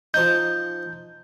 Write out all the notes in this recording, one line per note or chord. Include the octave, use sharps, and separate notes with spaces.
F3 D#4 G6